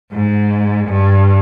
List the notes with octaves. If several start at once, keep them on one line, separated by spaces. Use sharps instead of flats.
G#2
G2